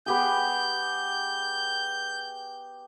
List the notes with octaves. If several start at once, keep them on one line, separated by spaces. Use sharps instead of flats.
B3 G4 G#4 G6